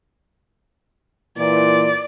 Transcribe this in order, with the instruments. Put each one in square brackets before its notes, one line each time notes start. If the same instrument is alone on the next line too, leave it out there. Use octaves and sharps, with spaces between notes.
[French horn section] A#2 E3 [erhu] D5